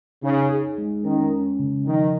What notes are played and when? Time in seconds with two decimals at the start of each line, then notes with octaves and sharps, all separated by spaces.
0.23 C#3 D#4
0.50 G#4
0.78 G#3
1.04 D#3 C#4
1.32 C#4
1.59 C#3
1.86 D#3 F3